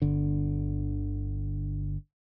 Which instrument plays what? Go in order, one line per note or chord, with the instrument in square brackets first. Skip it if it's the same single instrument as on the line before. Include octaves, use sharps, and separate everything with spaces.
[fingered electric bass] G1 D3